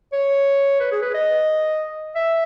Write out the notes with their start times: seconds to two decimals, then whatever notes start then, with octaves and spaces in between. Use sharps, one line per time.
0.13 C#5
0.80 B4
0.92 G#4
1.02 B4
1.14 D#5
2.15 E5